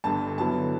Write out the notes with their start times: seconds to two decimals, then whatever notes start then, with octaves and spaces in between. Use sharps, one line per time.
0.04 G1 G2 D3 A5
0.38 G2 D3 F#3 B3 E4 A5